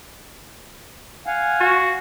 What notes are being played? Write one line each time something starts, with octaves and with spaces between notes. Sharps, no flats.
F5 F#5 G#5
F#4